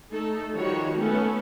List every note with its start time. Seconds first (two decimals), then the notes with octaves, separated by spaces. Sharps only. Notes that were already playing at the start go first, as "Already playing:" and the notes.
0.11 A3 D#4 A4
0.54 D#3 F3 G3 F#4 C#5
0.98 A3 B3 C#4 A4